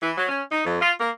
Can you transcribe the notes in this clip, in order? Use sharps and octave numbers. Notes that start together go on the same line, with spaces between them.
E3
F#3
C#4
D#4
F2
F4
A#3